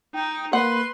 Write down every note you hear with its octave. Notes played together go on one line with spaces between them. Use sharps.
D#4 G5
A#3 B4 F#5 C6